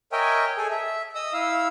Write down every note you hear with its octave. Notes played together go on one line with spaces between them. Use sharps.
A#4 C#5 D#5 E5 G5 G#5
G#4 A4 G#5
E5
D#5 D#6 E6
E4 F5 E6